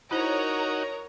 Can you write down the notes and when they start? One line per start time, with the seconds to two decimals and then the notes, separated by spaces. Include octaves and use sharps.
0.11 D#4 E4 F#4 A#4 C5 C#5 A#5